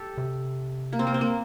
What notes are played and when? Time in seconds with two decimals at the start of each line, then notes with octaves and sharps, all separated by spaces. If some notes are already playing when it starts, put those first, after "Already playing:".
Already playing: G4 A4
0.18 C3
0.93 A#3
0.99 C4
1.07 A#3
1.14 C4
1.21 A#3